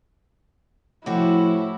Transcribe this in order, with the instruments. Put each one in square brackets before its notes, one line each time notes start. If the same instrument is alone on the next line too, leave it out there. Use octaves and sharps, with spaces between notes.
[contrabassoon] A2 [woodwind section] F3 [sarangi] E4 [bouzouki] F#4 G4